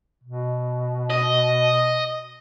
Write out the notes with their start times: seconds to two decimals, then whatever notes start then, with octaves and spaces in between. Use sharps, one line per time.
0.24 B2
1.10 D#5